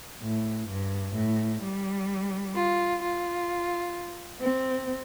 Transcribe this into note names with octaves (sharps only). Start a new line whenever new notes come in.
A2
G2
A2
G3
F4
F4
C4